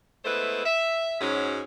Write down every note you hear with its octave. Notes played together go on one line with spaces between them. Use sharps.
G#3 A3 B3 E4 B4 C5
E5
G#2 F#3 C#4